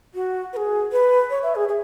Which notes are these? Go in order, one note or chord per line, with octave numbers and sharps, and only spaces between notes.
F#4
B4
G#4
B4
C#5
E5
G#4
G#4